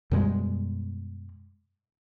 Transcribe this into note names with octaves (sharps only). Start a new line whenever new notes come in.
F#2 B2 G3 G#3